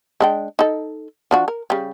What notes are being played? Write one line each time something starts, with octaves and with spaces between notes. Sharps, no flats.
G#3 D4 G5
D#4 A4
F3 D4 F#4
A#4
C#3 G3